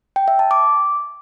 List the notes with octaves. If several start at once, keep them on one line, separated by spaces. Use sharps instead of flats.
G5
E5
A5
D6